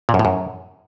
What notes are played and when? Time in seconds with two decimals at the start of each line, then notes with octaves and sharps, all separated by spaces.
0.09 A#2
0.14 F#2
0.19 A2
0.25 F#2